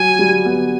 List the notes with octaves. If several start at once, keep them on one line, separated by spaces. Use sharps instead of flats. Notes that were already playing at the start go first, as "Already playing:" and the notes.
Already playing: F#3 G#5
G3
B3